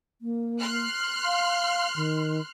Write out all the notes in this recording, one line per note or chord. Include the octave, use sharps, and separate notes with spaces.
A#3
C6 F6 F#6
F5
D#3